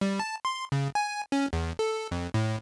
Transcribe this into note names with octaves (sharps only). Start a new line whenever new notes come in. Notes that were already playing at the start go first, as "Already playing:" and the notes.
G3
A5
C6
C#3
G#5
C#4
E2
A4
F2
A2